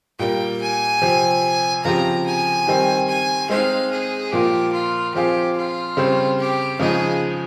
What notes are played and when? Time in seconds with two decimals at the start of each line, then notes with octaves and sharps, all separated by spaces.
0.19 A#2 G3 A#3 G5
0.61 G#5
1.02 C3 F3 C4 G4
1.84 C#3 F3 C4 G4 A#5
2.26 G#5
2.67 D#3 G3 C4
3.08 G#5
3.50 G#3 C4 D#4 F5
3.91 G#4
4.32 A#2 F3 A#3 F4 G4
4.73 F4
5.14 F3 C4 F4 G4 G#4
5.57 F4
5.97 C#3 G3 C4
6.39 G4
6.80 C#3 F3 G#3 D#4 G#4